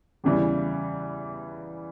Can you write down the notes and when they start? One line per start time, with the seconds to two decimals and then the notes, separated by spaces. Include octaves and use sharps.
0.24 E2 C#3 E3 G3